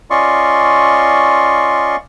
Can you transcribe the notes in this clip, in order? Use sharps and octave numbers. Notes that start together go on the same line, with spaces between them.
C#4 F4 D5 D#5 C6 C#6